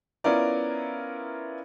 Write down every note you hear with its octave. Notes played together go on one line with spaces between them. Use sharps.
B3 C#4 E4 F4 A#4 D5